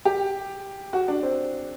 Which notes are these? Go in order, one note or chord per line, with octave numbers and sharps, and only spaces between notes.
G4
F#4
D4
C4